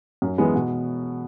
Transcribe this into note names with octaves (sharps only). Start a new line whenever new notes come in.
F#2
E3 G#3 B3
B2